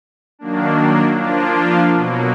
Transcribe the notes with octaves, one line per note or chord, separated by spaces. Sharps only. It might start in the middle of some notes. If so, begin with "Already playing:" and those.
D#3 F#3 A#3 D4
F3 A#3 D4 F4
B2 F#3 A#3